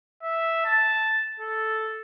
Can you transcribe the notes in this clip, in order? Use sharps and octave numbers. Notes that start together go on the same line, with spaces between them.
E5
A5
A4